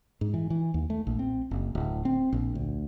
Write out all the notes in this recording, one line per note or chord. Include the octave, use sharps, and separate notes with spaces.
G#2
E3
E3
D#2
A3
A#1
C4
F#1
D1
C4
A#1
D2